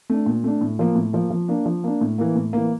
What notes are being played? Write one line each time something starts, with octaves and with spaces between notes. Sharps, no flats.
A3 D4
A#2
A3 D4
A2
F3 A#3
A2
F3 A#3
F3
A#3 D4
F3
A#3 D4
A2
E3 A#3
A2
E3 A#3